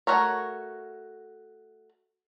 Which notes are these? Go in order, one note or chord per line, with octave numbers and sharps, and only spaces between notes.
A3 F#4 A#4 C#5